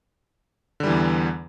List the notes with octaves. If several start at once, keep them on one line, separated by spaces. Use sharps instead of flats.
E2 D3 E3 G3